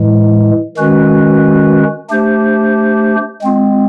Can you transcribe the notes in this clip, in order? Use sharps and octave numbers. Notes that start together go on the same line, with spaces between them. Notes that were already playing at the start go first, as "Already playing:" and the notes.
Already playing: A2 E3 G#3
D#3 G#3 C#4 F#4 B4
A3 D4 G4 C5
G#3 C4 F4